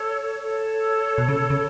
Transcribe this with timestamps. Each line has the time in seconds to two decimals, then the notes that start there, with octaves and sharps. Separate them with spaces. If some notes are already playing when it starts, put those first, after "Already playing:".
Already playing: A4 C#5
0.43 A4 C#5
1.18 B2
1.28 C#3
1.50 C#3